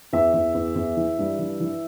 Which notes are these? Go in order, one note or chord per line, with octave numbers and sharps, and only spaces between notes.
E2 E5
E2
E2
E2
E3
G2
E3
E3